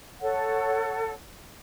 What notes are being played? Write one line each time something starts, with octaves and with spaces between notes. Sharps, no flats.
A4 C#5 F#5